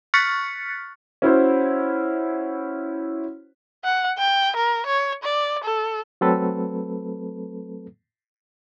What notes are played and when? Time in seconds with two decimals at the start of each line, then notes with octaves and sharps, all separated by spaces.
0.14 C#6 F6 F#6 A6 B6 C#7
1.22 C#4 E4 F#4 C5
3.84 F#5
4.18 G5
4.56 A#4
4.86 C#5
5.23 D5
5.64 A4
6.21 F#3 A3 C4 A4 B4